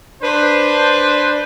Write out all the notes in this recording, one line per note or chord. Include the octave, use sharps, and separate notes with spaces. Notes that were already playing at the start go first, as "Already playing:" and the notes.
D4 B4 C5